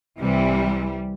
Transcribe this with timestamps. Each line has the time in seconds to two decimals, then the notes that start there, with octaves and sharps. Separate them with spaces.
0.19 C2 C3 E3 G3